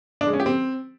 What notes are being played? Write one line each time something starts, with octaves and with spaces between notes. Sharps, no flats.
D4
G#3
C#4
G4
C4